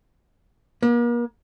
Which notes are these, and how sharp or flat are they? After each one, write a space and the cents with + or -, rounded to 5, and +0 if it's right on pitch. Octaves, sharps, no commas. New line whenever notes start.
A#3 +40